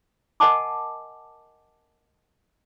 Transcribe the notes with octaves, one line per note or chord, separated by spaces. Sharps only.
A#4 D#5 F#5 G#5 A5 D6